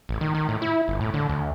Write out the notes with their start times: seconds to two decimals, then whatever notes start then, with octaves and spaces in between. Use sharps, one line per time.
0.09 A1
0.21 D#3
0.35 D#3
0.49 A2
0.62 E4
0.88 G1
1.01 A2
1.14 D3
1.29 D2